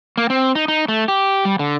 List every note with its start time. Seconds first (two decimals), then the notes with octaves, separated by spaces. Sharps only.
0.17 A#3
0.30 C4
0.55 D#4
0.68 D#4
0.88 A3
1.08 G4
1.45 G3
1.59 D3